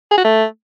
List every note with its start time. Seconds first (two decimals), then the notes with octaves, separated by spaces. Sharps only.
0.11 G#4
0.18 F#4
0.24 A3